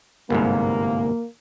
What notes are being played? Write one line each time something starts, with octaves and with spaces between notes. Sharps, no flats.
G1 C2 G#2 A#3